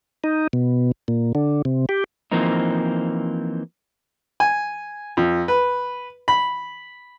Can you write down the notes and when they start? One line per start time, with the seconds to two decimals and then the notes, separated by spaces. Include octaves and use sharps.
0.24 D#4
0.53 B2
1.08 A#2
1.35 D3
1.65 C3
1.89 G4
2.32 E3 F3 A#3 C4 D#4
4.40 G#5
5.17 F2
5.48 B4
6.28 B5